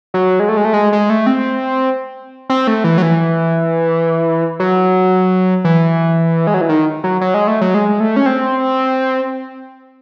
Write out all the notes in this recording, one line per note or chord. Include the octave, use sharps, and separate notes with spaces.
F#3
G#3
A3
G#3
A3
G#3
G#3
A3
C4
C4
A3
E3
F#3
E3
F#3
E3
G#3
F#3
E3
D#3
F#3
F#3
G#3
A3
F#3
G#3
A3
C#4
C4